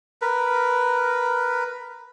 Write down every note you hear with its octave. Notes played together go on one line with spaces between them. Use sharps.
A#4 B4